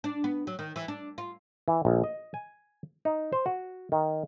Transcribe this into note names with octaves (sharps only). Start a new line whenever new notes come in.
D4
B3
F#3
D#3
E3
D4
F4
E3
A#1
D#5
G#5
D#4
C5
F#4
D#3